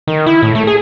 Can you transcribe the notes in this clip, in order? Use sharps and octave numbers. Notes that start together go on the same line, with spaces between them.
D#3
E4
A2
A3
G#4